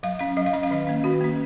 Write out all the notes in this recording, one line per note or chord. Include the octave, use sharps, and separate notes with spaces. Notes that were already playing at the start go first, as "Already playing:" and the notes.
F#3 F5
C#4 F5
F#3 D#5
F5
C#4 D#5
F5
D#3 D#5
A#3 C#4
D#3 F#4
A#3 C#4